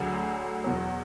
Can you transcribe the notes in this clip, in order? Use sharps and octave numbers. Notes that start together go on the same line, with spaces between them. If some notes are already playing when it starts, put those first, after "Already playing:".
Already playing: D2 D3 F#3 G#4
E2 B2 F#3